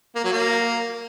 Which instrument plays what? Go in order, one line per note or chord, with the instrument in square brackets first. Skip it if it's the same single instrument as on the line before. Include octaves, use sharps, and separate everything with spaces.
[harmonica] A#3
F#3
A#3